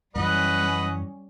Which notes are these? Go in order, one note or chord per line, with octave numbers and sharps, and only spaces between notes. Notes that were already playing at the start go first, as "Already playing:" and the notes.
F#2 E3 G3 C#4 B4 D#5 F#5